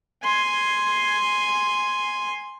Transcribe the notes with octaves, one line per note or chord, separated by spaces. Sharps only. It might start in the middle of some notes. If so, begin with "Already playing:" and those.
G#5 C6